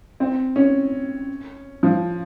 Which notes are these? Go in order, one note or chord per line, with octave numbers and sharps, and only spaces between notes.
C4
C#4
F3